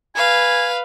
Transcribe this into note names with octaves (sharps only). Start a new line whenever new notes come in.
B4 F5 G#5